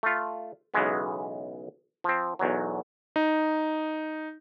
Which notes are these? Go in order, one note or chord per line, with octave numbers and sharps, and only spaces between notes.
A3 F4
B1 C#3 E3 G#3 B3
F3 C4
B1 E2 F#3
D#4